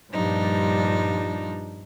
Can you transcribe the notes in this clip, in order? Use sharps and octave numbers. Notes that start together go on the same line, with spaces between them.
G2 A#2 F3 G3 D4 D#4